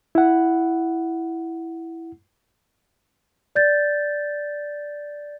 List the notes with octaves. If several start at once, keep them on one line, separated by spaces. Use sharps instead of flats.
E4 F#5
D5 G6 A6